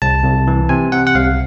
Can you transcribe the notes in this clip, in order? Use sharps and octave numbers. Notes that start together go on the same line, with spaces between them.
C2 A5
C2
E3
C3 G#5
C3 F#5
F#5
C2 F5